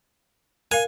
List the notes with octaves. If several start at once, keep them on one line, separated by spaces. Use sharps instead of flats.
A#4 F5 G#5